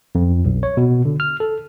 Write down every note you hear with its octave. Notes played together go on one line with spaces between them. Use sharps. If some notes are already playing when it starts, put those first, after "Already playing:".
F2
B1
C#5
B2
D3
F6
A4